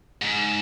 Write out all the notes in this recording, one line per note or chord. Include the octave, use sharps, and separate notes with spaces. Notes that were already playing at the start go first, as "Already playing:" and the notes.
G#2